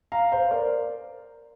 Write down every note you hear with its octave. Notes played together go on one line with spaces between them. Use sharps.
F5 A#5
C5 F5
A#4 D5